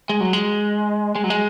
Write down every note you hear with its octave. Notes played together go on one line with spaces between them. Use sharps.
G#3
F#3
G#3
G#3
F#3
G#3